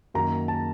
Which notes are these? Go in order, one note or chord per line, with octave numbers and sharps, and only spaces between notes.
F#2 D#3 F#3 A#3 A#5
A5